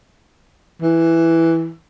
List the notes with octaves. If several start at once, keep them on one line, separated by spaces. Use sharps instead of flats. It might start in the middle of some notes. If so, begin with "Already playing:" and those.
E3